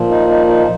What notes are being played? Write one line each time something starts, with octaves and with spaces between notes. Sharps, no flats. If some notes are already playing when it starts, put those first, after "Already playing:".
Already playing: A#2 F3
D#4
D#4
D#4